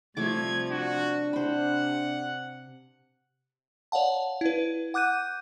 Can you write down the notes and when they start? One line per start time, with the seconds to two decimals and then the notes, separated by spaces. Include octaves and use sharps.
0.17 C3 F3 G3 A3 D6 G#6
0.71 D4 F#4
1.33 C3 C5 F#5 B5
3.92 C#5 D5 F5 F#5 A5
4.41 E4 B4
4.94 F#5 D6 F#6 G6 D#7